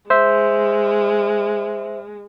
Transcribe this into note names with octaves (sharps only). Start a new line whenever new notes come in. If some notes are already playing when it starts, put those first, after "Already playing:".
G#3 C5 E5